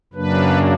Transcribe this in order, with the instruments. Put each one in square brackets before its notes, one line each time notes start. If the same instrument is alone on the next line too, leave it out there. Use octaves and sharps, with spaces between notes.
[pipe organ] F#2 C#3 F#3 A#3 D4 B4